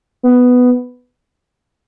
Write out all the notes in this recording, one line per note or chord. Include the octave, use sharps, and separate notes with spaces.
B3